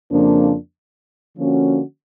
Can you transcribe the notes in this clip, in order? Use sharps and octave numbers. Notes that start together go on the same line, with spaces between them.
F2 C#3 F3 A#3 D4
D3 F3 A#3 C#4 F#4